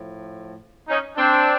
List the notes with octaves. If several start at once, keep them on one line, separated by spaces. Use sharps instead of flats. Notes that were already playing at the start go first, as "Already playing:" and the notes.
Already playing: A2 F3
C#4 D#4
C4 D4